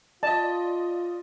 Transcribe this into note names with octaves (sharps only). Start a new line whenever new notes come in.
F4 D5 D#5 A5